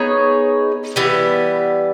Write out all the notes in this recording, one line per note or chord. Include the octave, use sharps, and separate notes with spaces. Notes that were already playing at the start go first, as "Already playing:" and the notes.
Already playing: B3 D#4 G#4 C#5
E3 G3 B3